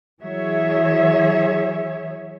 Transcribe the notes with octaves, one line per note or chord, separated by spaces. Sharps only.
E3 F#3 G#4 C#5 E5